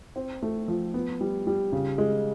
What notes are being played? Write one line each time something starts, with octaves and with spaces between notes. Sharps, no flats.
C4
A3
F3
B3
G3
G3
C#3
G#3